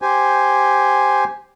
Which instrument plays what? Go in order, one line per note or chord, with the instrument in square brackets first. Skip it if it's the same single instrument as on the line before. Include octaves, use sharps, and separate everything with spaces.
[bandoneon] G4 C5 G#5